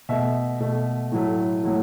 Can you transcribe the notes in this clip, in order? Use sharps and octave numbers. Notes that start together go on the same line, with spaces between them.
B2 A3 E5
B2 A3
A2 F#3 A3
A2 F#3 A3